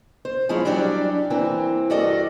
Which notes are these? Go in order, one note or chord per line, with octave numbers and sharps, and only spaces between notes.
C5
F3 G#3 E4 F4 G#4 C#5
F#3 G3 C#4 D4 G4 D5
E3 A#3 C4
G2 F#4 A4 D5 D#5